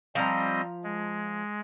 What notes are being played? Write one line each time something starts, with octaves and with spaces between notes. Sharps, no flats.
F3 G3 C4 D#5 A#5
G#3